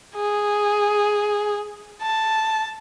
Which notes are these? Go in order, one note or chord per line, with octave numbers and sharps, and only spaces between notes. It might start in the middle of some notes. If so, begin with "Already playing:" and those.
G#4
A5